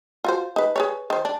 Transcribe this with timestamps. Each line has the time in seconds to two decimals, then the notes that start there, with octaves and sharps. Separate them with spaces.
0.24 F4 F#4 C5
0.56 D#4 B4
0.76 G#4 B4 C#5
1.10 D#3 C5
1.25 D4